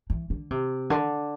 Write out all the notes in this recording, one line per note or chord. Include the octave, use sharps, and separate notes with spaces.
E3
D3
C3
D3